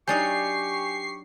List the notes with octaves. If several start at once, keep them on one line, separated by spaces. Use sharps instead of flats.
F#3 D4 D#4 G4 G#5 C#6 G6 C7